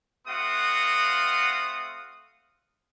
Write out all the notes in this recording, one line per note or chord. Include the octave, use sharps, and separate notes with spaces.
A3 C4 F#4 F5 F#5 D#6